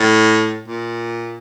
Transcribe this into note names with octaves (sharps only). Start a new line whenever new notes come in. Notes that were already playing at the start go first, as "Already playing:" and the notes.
Already playing: A2
A#2